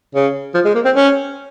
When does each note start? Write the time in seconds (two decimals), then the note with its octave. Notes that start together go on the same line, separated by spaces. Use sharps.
0.15 C#3
0.54 F3
0.65 G#3
0.75 A#3
0.85 C4
0.96 C#4